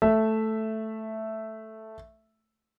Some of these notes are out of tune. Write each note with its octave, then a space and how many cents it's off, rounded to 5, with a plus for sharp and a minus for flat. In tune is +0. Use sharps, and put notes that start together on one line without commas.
A3 +0 E5 +0